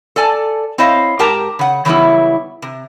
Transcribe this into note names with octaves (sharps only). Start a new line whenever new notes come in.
A4 D5 G#5 A5
C4 E4 C5 C#5 D#5 F5
G#2 G4 A#4 G5 A5 A#5
C#3 F#5
C#3 E3 F#3 G3 B3 E4
C3